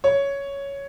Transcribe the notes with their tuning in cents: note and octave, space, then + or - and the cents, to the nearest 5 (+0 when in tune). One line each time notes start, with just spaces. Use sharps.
C#5 +5